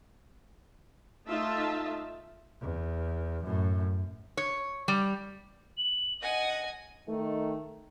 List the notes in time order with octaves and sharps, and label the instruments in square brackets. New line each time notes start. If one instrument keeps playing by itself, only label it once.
[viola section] A3 D#4 F4 E5 A5
[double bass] E2
F#2 A2
[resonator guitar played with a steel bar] C#5
G3
[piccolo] F#7
[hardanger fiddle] D#5 G#5 [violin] F#5 [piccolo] A#6
[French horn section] D#3 A3